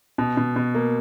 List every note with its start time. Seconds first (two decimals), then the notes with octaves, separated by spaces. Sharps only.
0.18 B2
0.37 B2
0.56 B2
0.75 A#3